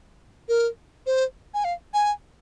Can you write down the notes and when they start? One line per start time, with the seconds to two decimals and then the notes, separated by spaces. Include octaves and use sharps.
0.49 A#4
1.06 C5
1.54 G#5
1.64 F5
1.94 G#5